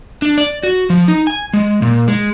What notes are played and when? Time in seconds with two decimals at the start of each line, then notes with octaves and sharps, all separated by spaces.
0.22 D4
0.38 D5
0.63 F#4
0.90 F3
1.08 D#4
1.27 G#5
1.53 G#3
1.82 A#2
2.08 G#3